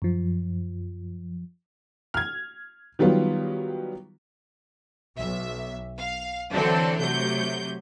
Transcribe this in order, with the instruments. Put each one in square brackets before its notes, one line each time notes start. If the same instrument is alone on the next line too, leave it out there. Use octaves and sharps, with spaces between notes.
[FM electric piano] F#2 F3
[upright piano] F6 G#6
D#3 F#3 G3 B3 F4
[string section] B1 E5
F5
D3 E3 F#3 C4 D4 A4
C3 F#3 A3 G6